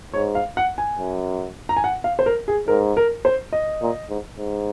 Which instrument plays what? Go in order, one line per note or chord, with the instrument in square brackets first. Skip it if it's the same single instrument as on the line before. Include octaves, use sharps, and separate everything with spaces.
[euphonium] G#2 [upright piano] C#5
[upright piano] F5
F#5
G#5
[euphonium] F#2
[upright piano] A#5
G#5
F#5
F5
C5
A#4
G#4
[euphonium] G#2 [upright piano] A#4
[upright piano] A#4
C5
D#5
[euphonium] A#2
G#2
G#2